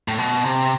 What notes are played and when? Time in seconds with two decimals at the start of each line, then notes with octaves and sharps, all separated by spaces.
0.08 A2
0.18 B2
0.45 C3